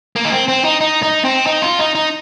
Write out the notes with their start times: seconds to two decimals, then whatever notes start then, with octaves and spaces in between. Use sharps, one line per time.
0.16 A#3
0.25 D#4
0.32 C4
0.48 C4
0.65 D#4
0.81 D#4
1.03 D#4
1.25 C4
1.46 D#4
1.62 F4
1.79 D#4
1.95 D#4